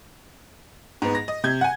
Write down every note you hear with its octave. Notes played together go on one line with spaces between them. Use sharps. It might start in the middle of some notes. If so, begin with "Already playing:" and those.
G#2 B3
A#6
D#5
C3 G6 G#6
F#5 G#5